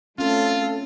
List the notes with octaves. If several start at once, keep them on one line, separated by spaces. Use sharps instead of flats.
A3 C4 C#4 F4 A4